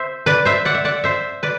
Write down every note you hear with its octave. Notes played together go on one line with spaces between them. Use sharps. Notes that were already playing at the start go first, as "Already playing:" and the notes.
Already playing: C5 E5
B4 D5
C5 E5
D5 F#5
E5
D5 F#5
C5 E5
B4 D5